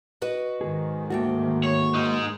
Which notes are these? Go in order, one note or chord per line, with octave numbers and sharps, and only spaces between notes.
F#4 B4 D#5
G#2 D#3 G#4
D2 A3 A#3 F#4 G5
C#5
G#3 D#4